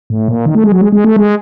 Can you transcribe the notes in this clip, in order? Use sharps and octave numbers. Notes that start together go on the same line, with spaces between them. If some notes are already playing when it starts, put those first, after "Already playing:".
A2
A#2
D#3
A3
G#3
F#3
G#3
G#3
A3
G#3